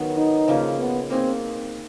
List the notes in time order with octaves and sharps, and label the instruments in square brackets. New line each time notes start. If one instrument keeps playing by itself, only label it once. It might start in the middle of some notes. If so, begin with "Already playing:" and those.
Already playing: [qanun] D#3 F#3 B3
[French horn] D#4
[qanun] C#3 F3 A#3
[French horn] B3
[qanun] A#3 D#4 G#4 [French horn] C4